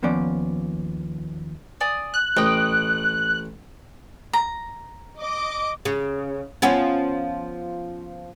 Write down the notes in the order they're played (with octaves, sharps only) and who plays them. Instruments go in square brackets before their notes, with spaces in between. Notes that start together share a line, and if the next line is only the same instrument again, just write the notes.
[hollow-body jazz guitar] D#2 F3 B3 C#4 D5
[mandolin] D5 G#5 D#6
[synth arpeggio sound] F#6
[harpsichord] A1 [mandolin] D#5 G5 D#6
[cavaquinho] A#5
[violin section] D#5 D6
[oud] C#3
F3 B3 C#4